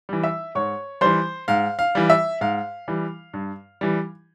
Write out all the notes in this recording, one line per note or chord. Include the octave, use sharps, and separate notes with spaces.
E3 G3
E5 E6
G#2 C#5 C#6
E3 G3 C5 C6
G#2 F5
F5
E3 G3
E5
G#2 F5
E3 G3
G2
E3 G3